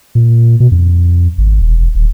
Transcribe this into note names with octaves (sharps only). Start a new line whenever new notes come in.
A#2
B2
F2
G#1
E1
D#1